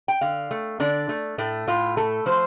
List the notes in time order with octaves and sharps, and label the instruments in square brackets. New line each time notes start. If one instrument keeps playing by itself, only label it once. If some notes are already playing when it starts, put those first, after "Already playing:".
[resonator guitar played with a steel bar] G5
D3 F5
A3
D3 D4
A3
A2 A3
A2 F4
A3 A4
F3 C5